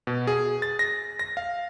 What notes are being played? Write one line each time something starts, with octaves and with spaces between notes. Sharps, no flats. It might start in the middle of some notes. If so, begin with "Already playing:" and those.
B2
G#4
A6
A#6
A#6
F5